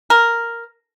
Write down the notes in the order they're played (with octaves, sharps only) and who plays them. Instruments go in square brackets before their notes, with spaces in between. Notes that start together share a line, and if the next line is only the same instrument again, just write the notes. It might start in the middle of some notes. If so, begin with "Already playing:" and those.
[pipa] A#4